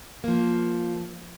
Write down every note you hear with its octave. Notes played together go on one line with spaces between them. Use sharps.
F3 A#3